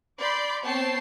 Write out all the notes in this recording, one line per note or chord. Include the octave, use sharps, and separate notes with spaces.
D5 B5 C6 D6 G6
B3 C4 C#5 G5 A5 C7